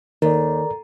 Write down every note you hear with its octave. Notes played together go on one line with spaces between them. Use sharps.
D#2 D#3 A4 A#4 D5 A#5